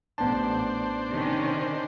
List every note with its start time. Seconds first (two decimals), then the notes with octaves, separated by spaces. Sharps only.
0.18 A1 B3 D4 C5 A5
1.09 C3 D#3 C#4